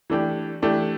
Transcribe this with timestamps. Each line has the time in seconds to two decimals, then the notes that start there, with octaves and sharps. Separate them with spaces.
0.10 E3 A3 D4 G4
0.62 E3 A3 D4 G4